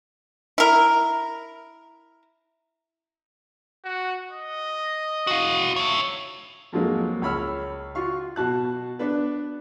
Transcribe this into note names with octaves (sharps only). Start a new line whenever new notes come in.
E4 A#4
F#4
D#5
F#4 F5
C#5 E5
F2 F3 F#3 G#3 A#3
C#2 C#5 B5 E6 F6
F4 F#4 F5 C#6
B2 F#4 A5 F#6
B3 D4 B4